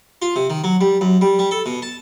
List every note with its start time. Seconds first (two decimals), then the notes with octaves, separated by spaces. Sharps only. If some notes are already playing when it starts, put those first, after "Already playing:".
0.22 F4
0.36 C3
0.50 D#3
0.64 F#3
0.81 G3
1.01 F#2
1.21 G3
1.39 G3
1.51 A4
1.66 B2
1.82 A5